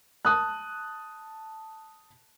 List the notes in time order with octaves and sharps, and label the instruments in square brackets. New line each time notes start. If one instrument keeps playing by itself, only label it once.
[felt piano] A5 D#6 F#6